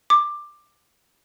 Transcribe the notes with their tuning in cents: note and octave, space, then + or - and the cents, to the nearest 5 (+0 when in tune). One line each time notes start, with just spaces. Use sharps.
D6 +15